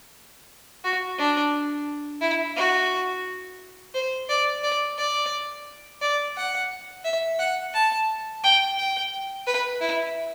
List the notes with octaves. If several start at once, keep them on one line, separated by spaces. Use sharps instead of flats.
F#4
D4
E4
F#4
C5
D5
D5
D5
D5
F#5
E5
F#5
A5
G5
G5
B4
E4